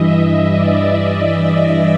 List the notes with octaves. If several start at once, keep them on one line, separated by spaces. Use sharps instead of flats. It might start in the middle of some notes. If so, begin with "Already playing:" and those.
Already playing: G2 E3 D#5 E5
D#5
D5
D#5